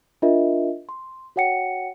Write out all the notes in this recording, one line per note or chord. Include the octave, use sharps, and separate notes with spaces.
D4 F4 A#4 D#5 E5
C6
F#4 C#5 F#5 G5 C#7